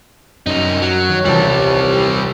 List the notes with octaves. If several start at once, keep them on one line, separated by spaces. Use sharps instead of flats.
C2 F#2 C#4 D#4
F#3
D#3 C#5
D#1 C2 E3 G3 C4 A5